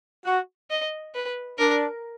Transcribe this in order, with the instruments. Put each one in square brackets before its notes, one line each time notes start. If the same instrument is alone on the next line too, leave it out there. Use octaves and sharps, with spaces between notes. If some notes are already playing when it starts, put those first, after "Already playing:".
[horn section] F#4
[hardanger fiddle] D#5
B4
[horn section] D4 [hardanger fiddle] A#4